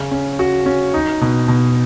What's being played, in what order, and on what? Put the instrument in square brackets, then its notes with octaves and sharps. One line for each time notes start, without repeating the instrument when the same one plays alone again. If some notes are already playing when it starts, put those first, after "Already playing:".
Already playing: [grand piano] C#3
C#4
F#4
C#4
D#4
B2
B2